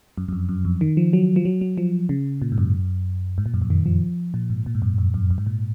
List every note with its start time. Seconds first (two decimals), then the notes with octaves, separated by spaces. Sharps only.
0.18 F#2
0.28 F#2
0.33 F2
0.49 F#2
0.65 F2
0.81 D#3
0.97 F3
1.13 F#3
1.36 F3
1.45 F#3
1.61 F#3
1.78 F3
2.09 C#3
2.42 A#2
2.52 G#2
2.58 F#2
3.38 G#2
3.46 A#2
3.54 F#2
3.62 F2
3.70 D#3
3.86 F3
4.34 A#2
4.50 G#2
4.66 A#2
4.75 G#2
4.82 F#2
4.98 F2
5.14 F#2
5.30 F#2
5.38 G#2
5.46 A#2